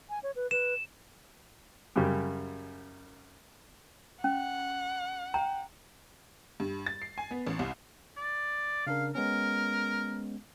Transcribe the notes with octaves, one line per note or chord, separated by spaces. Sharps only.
G#5
C#5
B4
B4 E7
F#2 C#3 G3
C#4 F#5
G5 A#5
G2
A6
C7
G#5
B3
A1
C2
D5
C#3 D4 A#4 F5
G#3 B3 C#4 A#4